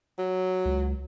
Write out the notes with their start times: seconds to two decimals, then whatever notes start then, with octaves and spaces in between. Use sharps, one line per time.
0.18 F#3
0.65 C#2